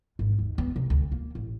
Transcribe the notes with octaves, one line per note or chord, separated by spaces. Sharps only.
G#1
D#2
B3
C3
D2
A#3
A1